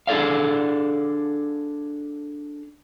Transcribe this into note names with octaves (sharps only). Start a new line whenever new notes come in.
D4 G#4 A4 D5 F5